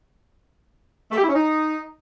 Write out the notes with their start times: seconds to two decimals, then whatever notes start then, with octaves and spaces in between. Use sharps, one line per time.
1.11 A3
1.17 G4
1.22 E4
1.28 C#4
1.34 D#4